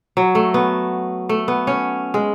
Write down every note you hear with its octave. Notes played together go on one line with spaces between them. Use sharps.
F#3
A3
B3
A3
B3
C#4
G#3